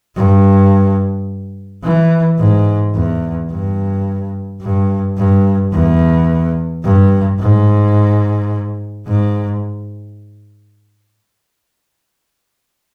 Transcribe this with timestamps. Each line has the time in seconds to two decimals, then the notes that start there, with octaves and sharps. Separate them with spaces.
0.16 G2
1.83 E3
2.38 G#2
2.94 E2
3.50 G2
4.62 G2
5.17 G2
5.73 E2
6.84 G2
7.40 G#2
9.07 G#2